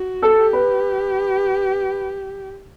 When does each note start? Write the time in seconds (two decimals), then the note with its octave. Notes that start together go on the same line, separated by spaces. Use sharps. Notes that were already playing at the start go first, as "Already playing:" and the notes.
Already playing: F#4
0.22 A4
0.38 G4
0.53 B4